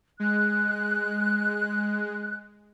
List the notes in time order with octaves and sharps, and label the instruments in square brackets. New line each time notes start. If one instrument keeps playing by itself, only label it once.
[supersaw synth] G#3 [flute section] F#6